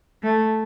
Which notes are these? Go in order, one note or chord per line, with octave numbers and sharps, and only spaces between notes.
A3